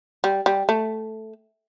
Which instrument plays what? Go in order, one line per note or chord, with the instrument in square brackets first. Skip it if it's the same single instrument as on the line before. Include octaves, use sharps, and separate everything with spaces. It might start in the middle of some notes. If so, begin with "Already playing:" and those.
[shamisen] G3
G3
A3